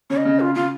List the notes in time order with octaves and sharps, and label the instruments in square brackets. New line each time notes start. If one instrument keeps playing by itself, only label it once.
[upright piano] C#3 [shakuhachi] C#5
[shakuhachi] D#5
[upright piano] C#3
[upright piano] C#3 [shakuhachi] F4
[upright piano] C#3 [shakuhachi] F4